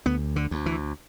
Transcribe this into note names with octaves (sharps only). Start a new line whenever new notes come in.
D2 B3
D3
D2
E3